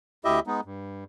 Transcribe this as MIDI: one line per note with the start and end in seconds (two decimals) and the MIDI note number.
0.25 0.40 38
0.25 0.40 64
0.25 0.40 67
0.25 0.40 75
0.25 0.40 76
0.47 0.61 56
0.47 0.61 59
0.47 0.61 63
0.65 1.04 43